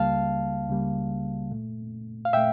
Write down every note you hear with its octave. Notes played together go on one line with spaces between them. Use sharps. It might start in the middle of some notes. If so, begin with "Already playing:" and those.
Already playing: C#2 C#3 G3 A#3 F5 A5
C#2 C#3 G3 A#3
A#2 A3
F5
A#2 A3 E5 G5